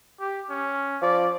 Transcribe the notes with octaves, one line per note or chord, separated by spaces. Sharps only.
G4
C#4
F3 D5